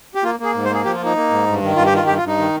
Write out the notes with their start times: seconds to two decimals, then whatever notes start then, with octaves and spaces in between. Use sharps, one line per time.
0.15 G4
0.23 A#3 F4
0.40 A#3 G#4
0.54 G#2
0.65 C5
0.69 A#3
0.74 G#4
0.85 F3 G4
0.95 F4
1.00 A#3 D#4
1.16 A#3
1.30 G#2
1.47 G2
1.62 D#3
1.76 G2 F4
1.86 G4
1.92 D#3 F4
2.07 G2 G4
2.17 F4
2.22 G2
2.27 D#4
2.38 D#3